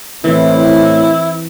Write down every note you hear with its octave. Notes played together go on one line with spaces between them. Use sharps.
A2 E3 C4 E4